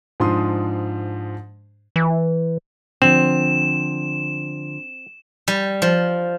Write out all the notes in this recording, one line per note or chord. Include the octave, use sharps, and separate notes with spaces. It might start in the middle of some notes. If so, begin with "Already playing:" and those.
G#2 F3 D4 C6 D#6
E3
D3 F3 C4 E7
G3
F3